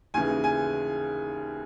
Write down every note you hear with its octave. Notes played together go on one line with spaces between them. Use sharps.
D#2 C#3 E3 G#5
G#5